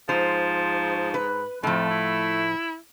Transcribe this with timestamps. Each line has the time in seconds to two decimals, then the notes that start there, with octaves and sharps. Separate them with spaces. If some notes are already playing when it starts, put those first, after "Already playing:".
0.09 G#2 F3 C5
1.14 B4
1.63 F2 A2 F3 A3
1.90 E4